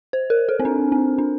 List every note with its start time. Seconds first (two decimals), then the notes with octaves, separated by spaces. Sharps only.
0.13 C5
0.30 A#4
0.49 A4
0.60 C4
0.65 D4
0.92 C4
1.18 D4